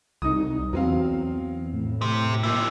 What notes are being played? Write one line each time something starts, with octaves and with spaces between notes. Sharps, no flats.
C2 D#4 D#6
E2 F#3 C4 F5
A2
G4 C5
A#2 E4 G4